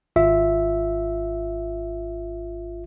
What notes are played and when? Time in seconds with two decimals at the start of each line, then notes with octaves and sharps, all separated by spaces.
0.16 G#1 F4 E5